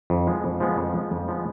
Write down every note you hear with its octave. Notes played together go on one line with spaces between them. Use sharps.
F2
F3 G#3 B3
F2
F3 G#3 B3
F2
F3 G#3 B3
F2
F3 G#3 B3